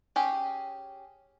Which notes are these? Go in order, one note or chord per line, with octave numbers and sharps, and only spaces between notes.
C#4 G4 G#4